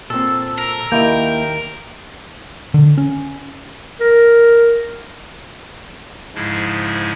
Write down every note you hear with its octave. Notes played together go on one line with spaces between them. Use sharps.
A#2 C4 A4
A#4
D#2 A#3 E4 D#5 G5
D3
C#4
A#4
G#2 C#3 F3 G#3 E4